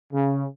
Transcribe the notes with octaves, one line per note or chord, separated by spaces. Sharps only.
C#3